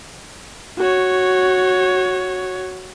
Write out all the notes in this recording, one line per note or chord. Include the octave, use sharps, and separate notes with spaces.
F#4 C#5